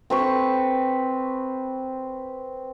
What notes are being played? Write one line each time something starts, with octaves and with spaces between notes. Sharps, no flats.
C4 B4 C#6